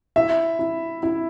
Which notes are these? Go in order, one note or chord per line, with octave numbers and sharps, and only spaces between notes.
E4 E5
E4
E4